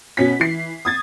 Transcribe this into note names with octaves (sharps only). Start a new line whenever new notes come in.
B2 C#4 B6
E3 C7
D#6 G#6 A6